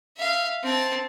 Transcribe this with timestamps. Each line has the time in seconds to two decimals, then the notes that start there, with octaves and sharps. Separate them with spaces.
0.17 E5 F5
0.63 C4 A5